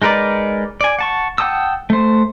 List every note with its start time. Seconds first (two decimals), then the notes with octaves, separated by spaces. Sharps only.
0.02 G#3 D#4 A#4 B4 D5
0.81 D5 G#5
0.99 F#5 A5 C#6
1.38 F#5 G5 A5 D#6 E6
1.90 A3 C5